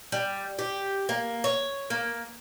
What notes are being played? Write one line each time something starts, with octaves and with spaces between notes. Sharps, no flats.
G3
G4
A#3
C#5
A#3